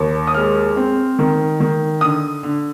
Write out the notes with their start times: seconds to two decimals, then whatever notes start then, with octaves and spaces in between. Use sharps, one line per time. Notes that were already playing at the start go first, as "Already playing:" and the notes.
Already playing: D#2
0.27 D#6
0.34 G#3 F6
0.76 C4
1.19 D#3
1.60 D#3
2.01 D3 D#6
2.43 D3